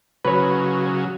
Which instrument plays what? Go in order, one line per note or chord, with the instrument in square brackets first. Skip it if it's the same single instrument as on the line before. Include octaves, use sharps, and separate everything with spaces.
[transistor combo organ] C#3 F#3 [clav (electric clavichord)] B4 C#5